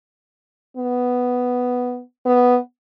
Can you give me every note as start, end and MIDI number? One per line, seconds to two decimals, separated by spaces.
0.77 2.01 59
2.26 2.58 59